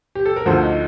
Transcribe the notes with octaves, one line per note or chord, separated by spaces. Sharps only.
G4
A4
A#4
D2 D3 F3 A3 C5
D#4